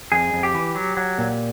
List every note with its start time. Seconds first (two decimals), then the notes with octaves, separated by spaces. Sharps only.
0.12 F2 G#4
0.33 F2
0.43 G4
0.54 E3
0.75 F#3
0.97 F#3
1.18 A#2